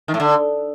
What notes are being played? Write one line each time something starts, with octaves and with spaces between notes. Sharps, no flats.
D#3
A2
D3